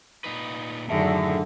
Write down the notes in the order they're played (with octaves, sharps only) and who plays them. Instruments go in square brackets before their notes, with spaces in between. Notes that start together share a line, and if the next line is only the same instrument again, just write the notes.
[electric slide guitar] A#2 D#4 B4
[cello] F#2 D#3 [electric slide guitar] A2 [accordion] D3 [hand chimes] G#4 E5 A5